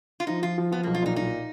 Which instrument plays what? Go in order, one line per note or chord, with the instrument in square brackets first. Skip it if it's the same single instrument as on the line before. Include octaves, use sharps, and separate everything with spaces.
[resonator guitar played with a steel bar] F4
[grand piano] F3 [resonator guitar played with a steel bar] D#4
[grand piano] F3 [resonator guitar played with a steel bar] F4
[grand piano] F3
[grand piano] F3 [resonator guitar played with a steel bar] B3
[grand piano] B1 [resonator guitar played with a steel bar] A#3
[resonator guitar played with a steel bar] F4
[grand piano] A#2 [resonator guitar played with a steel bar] D#4
[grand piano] B1 [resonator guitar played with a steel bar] D#4